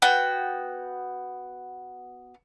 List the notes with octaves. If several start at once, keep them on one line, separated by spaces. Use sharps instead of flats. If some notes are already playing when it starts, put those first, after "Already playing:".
B3 F#4 G5